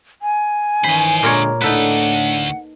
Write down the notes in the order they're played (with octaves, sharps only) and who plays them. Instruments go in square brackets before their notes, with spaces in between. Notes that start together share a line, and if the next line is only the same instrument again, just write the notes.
[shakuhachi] G#5
[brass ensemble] D#3 E3 C#4 [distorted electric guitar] C5 D#5 [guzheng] B5
[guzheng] A#2 A#4 C#5 [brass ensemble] D3 G#3
[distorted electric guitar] D2 A3 [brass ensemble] A2 D4 [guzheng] D#4 A4 B4 [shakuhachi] F#5